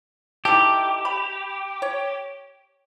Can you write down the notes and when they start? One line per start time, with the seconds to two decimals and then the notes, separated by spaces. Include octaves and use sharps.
0.45 D#4 E4 G4 A4
1.05 B5
1.82 C#5